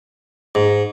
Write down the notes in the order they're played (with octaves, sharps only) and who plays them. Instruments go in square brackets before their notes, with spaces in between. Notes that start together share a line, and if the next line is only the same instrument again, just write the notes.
[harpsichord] G#2